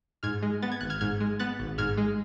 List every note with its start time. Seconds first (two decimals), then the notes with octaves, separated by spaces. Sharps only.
0.23 G#2 F6 G#6
0.43 G#3
0.62 B3 A6
0.72 G#6
0.81 G#1 F#6
0.90 F6 G#6
1.01 G#2 F6 G#6
1.20 G#3
1.39 B3 F#6 A6
1.60 G#1
1.78 G#2 F6 G#6
1.97 G#3